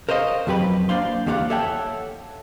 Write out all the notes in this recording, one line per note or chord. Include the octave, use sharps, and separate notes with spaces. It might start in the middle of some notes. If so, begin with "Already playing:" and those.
A#4 C5 C#5 D#5 F5
F2 F#3 G4 B4 B5
A#3 D4 C5 D5 F5 C6
E2 A#3 G4 D5 F5 F#5
A4 C#5 E5 F#5 G5 A5